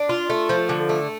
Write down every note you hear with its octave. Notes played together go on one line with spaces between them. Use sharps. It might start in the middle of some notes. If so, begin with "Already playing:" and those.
Already playing: D4
F4
A3
F3
D3
A3